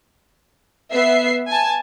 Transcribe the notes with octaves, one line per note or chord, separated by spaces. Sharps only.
B3 E5 C7
G#5 A5